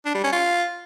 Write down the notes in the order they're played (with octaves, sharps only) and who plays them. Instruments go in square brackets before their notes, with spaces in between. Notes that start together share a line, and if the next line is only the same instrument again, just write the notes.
[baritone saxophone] D4
G3
C#4
F4